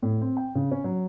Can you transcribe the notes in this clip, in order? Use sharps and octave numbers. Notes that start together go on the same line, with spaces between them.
A2
C4
G5
C#3
C#4
F#3